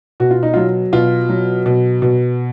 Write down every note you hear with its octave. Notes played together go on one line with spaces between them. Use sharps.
B2 F#4
F4
D#4
F#3 F4
B2 F4
F#3
B2
B2